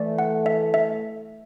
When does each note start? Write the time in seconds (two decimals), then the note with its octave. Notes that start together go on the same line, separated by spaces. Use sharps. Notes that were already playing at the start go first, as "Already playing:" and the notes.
Already playing: E3 A3 D5
0.19 F#5
0.46 E5
0.74 E5